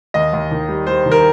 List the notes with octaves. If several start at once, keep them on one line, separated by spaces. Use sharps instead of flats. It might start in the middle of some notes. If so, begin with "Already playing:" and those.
D#2 D#5
D#2
D#3
G3
G3 C5
D#3
A#4